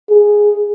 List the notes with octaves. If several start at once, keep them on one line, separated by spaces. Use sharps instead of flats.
G#4